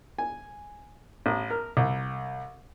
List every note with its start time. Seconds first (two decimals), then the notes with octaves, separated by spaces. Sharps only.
0.18 G#5
1.26 A1
1.50 A#4
1.77 C2